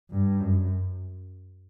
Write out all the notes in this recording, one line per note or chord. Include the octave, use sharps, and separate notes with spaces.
G2
F#2